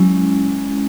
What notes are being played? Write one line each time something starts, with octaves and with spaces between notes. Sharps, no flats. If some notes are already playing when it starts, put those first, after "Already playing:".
Already playing: F#3 G#3 C#4 E4